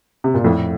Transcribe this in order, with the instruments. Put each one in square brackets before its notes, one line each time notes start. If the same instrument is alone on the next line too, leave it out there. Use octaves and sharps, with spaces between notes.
[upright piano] C3
A#2
F2 A2